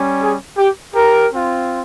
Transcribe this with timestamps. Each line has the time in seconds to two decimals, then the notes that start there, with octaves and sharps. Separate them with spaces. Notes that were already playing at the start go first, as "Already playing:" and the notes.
Already playing: G3 C#4
0.21 G#4
0.57 G4
0.94 G4 A#4
1.32 C4 F4